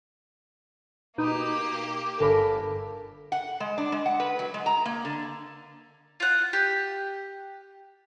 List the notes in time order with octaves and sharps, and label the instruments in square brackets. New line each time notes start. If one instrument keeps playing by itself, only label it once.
[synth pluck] B2 D#4 [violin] A#3 G4
[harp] G1 A#4 B5 [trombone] A4
[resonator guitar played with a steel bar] F#5
G#3
D4
G#3
F#5
B4
F#3
G#3
A#5
A#3
D3
[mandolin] F4 F#5
G4